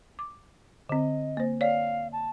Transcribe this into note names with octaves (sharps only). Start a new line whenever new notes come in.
D6
D3 C4 D#5
A#3 C5
C#5 D5 F5
A5